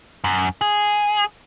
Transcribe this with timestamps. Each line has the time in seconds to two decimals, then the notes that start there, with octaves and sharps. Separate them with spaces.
0.24 F#2
0.61 G#4